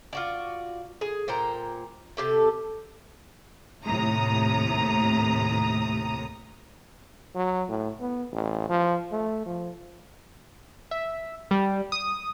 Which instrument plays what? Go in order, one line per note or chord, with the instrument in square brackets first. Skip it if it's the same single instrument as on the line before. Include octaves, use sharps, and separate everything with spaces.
[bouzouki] F4 F#4 D5
G#4
A#2 C5 G5 A#5
C3 G4 A4
[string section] D#2 A2 C3 A#5 D#6
[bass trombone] F#3
A2
B3
A1
F3
A3
F3
[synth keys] E5
G3
D#6